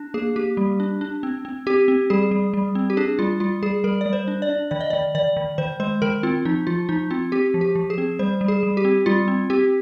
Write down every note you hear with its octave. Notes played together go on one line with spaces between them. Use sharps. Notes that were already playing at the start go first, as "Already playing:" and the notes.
Already playing: D4
A#3 G#4
A#3 G4
G3
D4
D4
C4
C4
C4 G4
C4
G3 G#4
G3
G3
C4
G4
D4 G#4
G3 F4
G3 F4
G3 G#4
G3 A#4
G3 D5
C5
D4
D5
D4
D#3 D5
D#5
D#3 D5
D#3 D5
D#3
D#3 C5
G#3 C5
D#3 A#4
C4 F4
F3 D#4
F3 F4
F3 D#4
C4 F4
C4 G4
F3
G4
F3
G#4
C4
G3 C5
G3
G#4
G3
G4
C4
G3 F4
C4
C4 G4